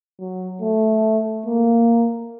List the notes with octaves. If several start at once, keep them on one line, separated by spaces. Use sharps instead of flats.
F#3
A3
A#3